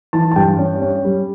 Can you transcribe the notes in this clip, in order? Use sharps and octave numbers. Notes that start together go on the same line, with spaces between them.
E3 A5
A5
G2 G5
C#4
C#4
G3